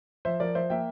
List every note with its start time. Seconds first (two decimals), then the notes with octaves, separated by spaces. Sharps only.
0.25 F3 C5 E5
0.40 F3 A#4 D5
0.55 F3 C5 E5
0.70 A#3 E5 G5